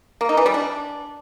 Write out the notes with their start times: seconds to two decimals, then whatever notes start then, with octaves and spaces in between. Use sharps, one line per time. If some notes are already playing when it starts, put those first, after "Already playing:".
0.21 A#3
0.29 D#4
0.37 E3
0.46 G3
0.54 D4